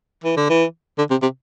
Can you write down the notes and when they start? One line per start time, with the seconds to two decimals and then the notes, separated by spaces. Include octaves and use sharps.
0.24 E3
0.37 D3
0.50 E3
0.98 D3
1.11 C3
1.22 C3